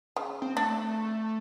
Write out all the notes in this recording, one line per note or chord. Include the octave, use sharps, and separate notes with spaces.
C#3
C4
A3 D4